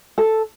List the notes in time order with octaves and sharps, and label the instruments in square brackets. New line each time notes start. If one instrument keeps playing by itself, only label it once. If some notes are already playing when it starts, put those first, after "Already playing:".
[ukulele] A4